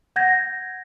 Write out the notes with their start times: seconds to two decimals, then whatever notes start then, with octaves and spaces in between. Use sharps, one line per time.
0.16 F#5 G6 G#6 A#6